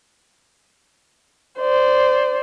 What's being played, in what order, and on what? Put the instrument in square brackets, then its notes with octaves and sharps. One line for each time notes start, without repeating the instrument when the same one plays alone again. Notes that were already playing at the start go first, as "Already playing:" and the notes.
[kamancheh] C5 D5